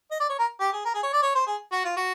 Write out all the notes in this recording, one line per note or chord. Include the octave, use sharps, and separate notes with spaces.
D#5
D5
C#5
A#4
G4
G#4
A#4
G#4
C#5
D5
C#5
C5
G#4
F#4
F4
F#4